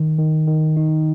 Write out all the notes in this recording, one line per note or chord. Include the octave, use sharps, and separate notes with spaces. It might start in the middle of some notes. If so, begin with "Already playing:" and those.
Already playing: D#3
D#3
D#3
D#4